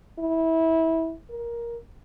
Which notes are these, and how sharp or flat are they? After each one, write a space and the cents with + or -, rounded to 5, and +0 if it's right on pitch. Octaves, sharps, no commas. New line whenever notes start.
E4 -20
A#4 +10